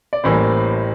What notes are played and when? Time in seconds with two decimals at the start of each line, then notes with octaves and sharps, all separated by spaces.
0.13 D5
0.24 A1 A2 E3 G3 A#3 C5